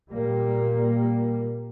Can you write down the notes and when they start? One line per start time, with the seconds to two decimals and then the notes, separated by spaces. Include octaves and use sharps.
0.11 A#2 G3 A#3